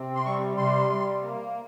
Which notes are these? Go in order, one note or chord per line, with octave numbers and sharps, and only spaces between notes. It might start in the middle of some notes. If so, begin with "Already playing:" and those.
Already playing: C3 C4
C6
G3 C#6
C3 C6
G3
A#3